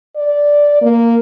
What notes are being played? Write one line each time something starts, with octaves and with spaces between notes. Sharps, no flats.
D5
A#3